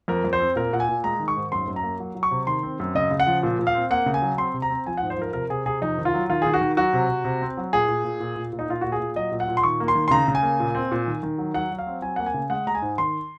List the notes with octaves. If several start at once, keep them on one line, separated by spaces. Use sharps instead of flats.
F2 A#4
F2
C5
C4
A#2 A#4
A#2 F#5
G#5
A#2
G#3 A#5
D#3
C#6
G#2
F#2 C6
F#2
A#5
A#3
F#3
F#3
C#6
C3
D#3 C6
C4
F#2
C#3 D#5
C#3
F#5
F3
A#2
A#2
F5
C4
A#3 F#5
C#3
G#5
F#3
C4 C6
C3
A#5
C4
F3 G#5
F#5
G#2
C5
F3 A#4
C3 A#4
C3 G#4
C3 G#4
F2 D#4
D#3
F4
F#3
D#3 F4
D#3 G#4
F#4
D#3
F#3 F#4
C3
C3
C3
C4
F#3
A#2 G#4
A#2
A#2
A#2
A#2
A#2
D#4
A#2 F4
A#2 F#4
G#4
A#2
F#3 D#5
A#2
F#5
A#2
C6
D#3 C#6
A#3
C6
D#3
C6
C#3 A#5
C#3
G#5
A#3
A#2
C4
A#2
D#3
D#3
F#3
F#3 F#5
F#3
F5
C4
F#3 G#5
A#3 F#5
G#5
C#3
G#3 F#5
G#3 A#5
G#5
G#2
D#3 C6